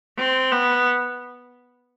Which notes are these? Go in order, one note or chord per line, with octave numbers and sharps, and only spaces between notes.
C4
B3